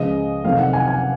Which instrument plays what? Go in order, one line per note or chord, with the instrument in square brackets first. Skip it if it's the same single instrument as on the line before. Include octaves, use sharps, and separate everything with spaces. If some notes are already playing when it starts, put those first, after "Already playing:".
Already playing: [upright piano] C#2 C#3 F3 G#3 D#5
F#1 F2 C3 D#3 F5
F#5
G#5
G#5